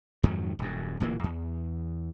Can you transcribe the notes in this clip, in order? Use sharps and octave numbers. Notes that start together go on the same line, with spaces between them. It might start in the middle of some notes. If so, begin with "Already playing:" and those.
F2 G#2 D#3 F#3
D#1 F#2
D1 A#2 E3 A#3
E2